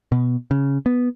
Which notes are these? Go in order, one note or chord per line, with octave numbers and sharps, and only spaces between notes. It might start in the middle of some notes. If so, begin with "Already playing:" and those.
B2
C#3
B3